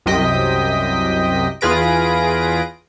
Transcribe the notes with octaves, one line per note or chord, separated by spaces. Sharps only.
C2 F#2 C3 D#5 G5 B6
E2 F4 G#4 B4 A#6 D7